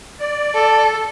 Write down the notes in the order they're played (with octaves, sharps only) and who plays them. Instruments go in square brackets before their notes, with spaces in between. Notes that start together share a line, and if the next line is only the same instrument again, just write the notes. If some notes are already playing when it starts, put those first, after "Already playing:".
[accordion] D5
[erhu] A4